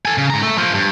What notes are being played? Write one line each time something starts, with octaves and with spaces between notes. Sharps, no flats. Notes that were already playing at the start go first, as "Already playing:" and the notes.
A4 G#5
C#3
G#2 A#5
A3
F3 A#3
G2